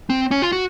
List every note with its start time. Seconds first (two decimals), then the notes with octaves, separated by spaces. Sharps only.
0.10 C4
0.31 C#4
0.42 F4
0.52 F#4